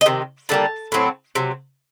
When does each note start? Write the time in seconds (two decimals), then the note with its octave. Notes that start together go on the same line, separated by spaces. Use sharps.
0.01 D#5
0.06 C3 D#3
0.49 D3 G3 A#3 A5
0.92 A2 F#3 C4
1.35 C3 F#3